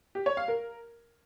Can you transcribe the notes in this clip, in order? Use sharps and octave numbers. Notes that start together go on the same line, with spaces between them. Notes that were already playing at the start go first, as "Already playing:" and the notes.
G4
C#5
F5
A#4